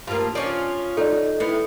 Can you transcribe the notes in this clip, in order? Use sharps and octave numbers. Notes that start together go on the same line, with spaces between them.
G2 F3 A#3 F4
F3 C#4 F4 D5
D#4 A4 D5
A2 B3 E4